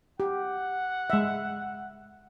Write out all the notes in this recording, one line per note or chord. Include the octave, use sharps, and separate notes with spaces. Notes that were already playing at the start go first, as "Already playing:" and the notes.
G4 F#5
G#3 E5